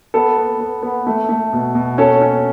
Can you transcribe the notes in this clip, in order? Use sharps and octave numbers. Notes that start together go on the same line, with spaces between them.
B3 A4
B3
B3
B3
A3
A3
B2
B2
C#4 A4
C#4